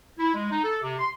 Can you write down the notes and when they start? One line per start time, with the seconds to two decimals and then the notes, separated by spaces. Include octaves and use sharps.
0.19 E4
0.34 G#3
0.51 D#4
0.63 A4
0.83 C3
0.99 C6